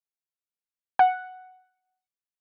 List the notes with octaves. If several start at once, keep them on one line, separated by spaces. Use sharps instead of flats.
F#5